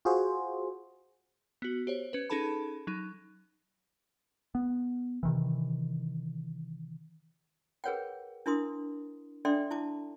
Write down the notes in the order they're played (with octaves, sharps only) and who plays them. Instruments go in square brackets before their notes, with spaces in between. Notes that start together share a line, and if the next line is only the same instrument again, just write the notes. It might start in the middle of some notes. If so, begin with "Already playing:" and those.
[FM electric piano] F4 F#4 G#4 C5
[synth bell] B3 F#4
G4 C5 C#5
C#4 B4
C#4 D#4 G#4 A4 A5 B5
F#3 D#4
[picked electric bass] B3
C3 D#3 E3
[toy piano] G#4 A#4 B4 C#5 F#5 G5
D4 E4 A#4 C6 D#6
D4 A4 D5 E5 G5 C6
E4 A5 D6